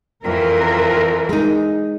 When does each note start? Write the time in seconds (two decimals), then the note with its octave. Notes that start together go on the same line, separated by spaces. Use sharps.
0.24 F2 E3 A#4
1.29 G#3 D#4